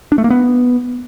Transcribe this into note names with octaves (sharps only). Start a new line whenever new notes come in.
D4
A3
A#3
B3